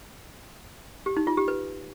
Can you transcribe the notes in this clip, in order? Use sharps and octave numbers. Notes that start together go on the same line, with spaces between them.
G4
D#4
F4
G4
B4